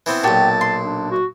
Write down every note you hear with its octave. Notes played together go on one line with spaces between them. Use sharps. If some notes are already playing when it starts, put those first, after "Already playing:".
E3 B3 C4
B1 A#2 F#4 G4 G5 A5
C6
D4
F#4